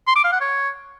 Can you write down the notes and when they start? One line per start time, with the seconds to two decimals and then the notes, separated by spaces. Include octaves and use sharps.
0.07 C6
0.16 D6
0.24 F5
0.32 F#5
0.40 C#5